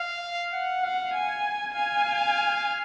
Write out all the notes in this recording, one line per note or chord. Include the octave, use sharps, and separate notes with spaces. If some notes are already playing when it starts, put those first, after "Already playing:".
Already playing: F5
F#5
F5 F#5
G#5
F5 G#5
F5